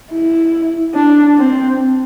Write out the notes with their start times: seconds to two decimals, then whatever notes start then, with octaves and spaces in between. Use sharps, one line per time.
0.11 E4
0.94 D4
1.37 C4